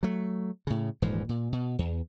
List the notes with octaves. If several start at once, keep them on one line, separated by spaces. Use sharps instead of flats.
F#3 A3
A2 C#3
D#1 G#2 E3 F3
A#2
B2
E2